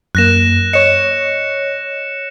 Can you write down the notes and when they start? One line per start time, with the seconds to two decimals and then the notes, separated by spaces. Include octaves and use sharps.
0.15 F#2 A#3 F#6 A#6 E7
0.73 C#5 D#5 C#7 E7